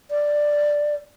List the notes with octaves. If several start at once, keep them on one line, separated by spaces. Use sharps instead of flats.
D5